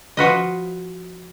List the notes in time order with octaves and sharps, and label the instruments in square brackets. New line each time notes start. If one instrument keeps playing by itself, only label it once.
[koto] F3 F#4 B4 D#5